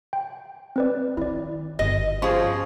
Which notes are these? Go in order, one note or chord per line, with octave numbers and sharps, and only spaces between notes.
G5
C4 B4 D5
D#3 E4 D5
G1 D#5
F3 C#4 G#4 C6